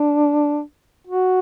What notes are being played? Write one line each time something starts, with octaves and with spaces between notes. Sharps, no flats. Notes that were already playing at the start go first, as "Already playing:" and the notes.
Already playing: D4
F#4